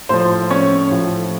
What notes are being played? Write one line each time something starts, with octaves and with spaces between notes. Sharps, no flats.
A2 F3 C5
C#4 C#5
A2 F3